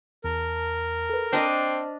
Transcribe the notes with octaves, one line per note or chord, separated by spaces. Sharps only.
E2 A#4 A5
A4 B4
C4 D4 C5 D#5 A5 D6 F6